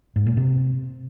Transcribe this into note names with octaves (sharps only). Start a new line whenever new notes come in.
G#2
A#2
C3